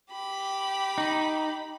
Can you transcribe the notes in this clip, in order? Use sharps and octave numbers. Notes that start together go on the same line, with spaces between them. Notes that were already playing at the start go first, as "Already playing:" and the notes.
G4 B5
D#4